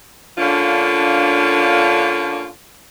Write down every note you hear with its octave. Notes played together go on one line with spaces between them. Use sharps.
D3 A#3 C#4 D4 F4